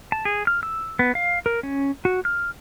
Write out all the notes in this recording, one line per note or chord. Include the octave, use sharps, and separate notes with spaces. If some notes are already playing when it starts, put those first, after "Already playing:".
A5
G#4
F6
E6
B3
F5
A#4
C#4
F#4
F6